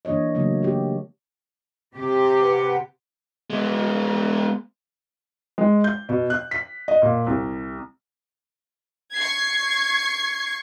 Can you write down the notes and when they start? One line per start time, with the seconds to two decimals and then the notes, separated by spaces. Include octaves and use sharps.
0.05 E3 A#3 D4 C#5 D#5
0.35 C#3 F#3 A3 A#3
0.63 A#3 G4
1.95 C3 G4
2.40 B4 F#5
3.50 G#3 B3
5.58 G#3
5.84 G6
6.09 B2
6.30 F#6
6.51 B6
6.88 D#5
7.02 A#2
7.27 C2
9.15 C#6 G#6 C7